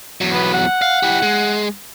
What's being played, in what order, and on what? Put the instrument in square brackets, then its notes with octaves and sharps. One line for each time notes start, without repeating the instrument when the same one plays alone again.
[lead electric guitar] E2 F#3
[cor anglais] B3
F#5
[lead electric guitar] F5
E4 G4
G#3